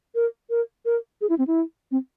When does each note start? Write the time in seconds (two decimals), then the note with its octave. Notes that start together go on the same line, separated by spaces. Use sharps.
0.15 A#4
0.50 A#4
0.85 A#4
1.21 G#4
1.29 E4
1.38 C4
1.47 E4
1.91 C4